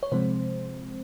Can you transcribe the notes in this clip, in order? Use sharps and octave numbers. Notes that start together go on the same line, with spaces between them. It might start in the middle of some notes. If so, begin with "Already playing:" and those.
C#5
C3 F3 G#3 C4 C5